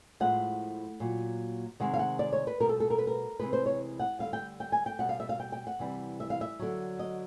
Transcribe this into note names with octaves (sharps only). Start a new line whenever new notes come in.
A2 F3 G#3 F#5
A#2 F#3
C3 D#3 G#3 F#5
F5
F#5
D5
C#5
B4
B2 G3 A#4
A4
A4
A#4
B4
A#4
C3 E3 G#3 B4
C5
C#5
F#5
D3 G3 F5
G5
G5
G#5
G5
B2 G3 F#5
F5
E5
F5
G5
G5
F#5
C3 E3 G3
E5
F5
E5
D3 F#3
D#5